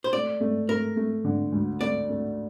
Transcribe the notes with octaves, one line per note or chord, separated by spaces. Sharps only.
C5
A3 D5
A3
A3 A#4
A3
D3
D2
A3 D5
A3